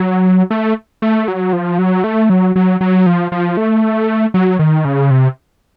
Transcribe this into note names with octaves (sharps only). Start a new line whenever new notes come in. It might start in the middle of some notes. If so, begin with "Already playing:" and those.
Already playing: F#3
A3
A3
F#3
F3
F#3
A3
F#3
F#3
F#3
F3
F3
A3
F#3
D#3
C#3
C3